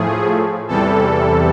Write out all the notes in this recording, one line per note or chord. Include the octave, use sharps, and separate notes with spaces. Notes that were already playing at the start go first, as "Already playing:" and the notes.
Already playing: A2 F3 A3 G#4
E2 C3 E3 G3 A4